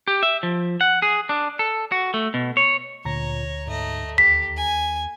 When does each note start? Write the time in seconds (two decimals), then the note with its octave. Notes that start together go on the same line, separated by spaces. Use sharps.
0.08 G4
0.23 E5
0.43 F3
0.81 F#5
1.02 G#4
1.29 D4
1.59 A4
1.92 F#4
2.14 A3
2.34 B2
2.57 C#5
3.05 D2 A#2 C#5 A#5 A#6
3.67 G#2 A3 D#5
4.18 D#2 G4 B6
4.57 G#5